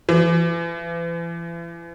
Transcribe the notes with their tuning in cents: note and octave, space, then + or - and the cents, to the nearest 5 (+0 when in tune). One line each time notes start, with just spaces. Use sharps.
E3 +40